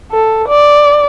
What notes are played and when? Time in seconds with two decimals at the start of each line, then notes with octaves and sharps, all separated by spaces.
0.11 A4
0.48 D5